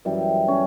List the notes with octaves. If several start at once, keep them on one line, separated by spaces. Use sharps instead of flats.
F#2 E3 G3
C#4